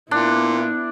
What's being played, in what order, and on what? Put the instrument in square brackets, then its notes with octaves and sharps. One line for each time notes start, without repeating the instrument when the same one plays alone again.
[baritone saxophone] A#2 [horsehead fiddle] B3 E4 [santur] D4